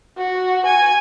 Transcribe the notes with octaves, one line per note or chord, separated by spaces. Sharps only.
F#4
G#5